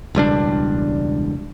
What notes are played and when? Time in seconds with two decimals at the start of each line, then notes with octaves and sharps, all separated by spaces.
0.15 E1 C#2 G3 D4